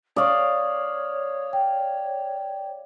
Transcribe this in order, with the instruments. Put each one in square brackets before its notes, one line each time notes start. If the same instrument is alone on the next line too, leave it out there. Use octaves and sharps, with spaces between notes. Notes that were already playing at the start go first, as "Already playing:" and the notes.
[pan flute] C#5 [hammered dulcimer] D5 F5 [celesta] C#6 D#6
[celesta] G5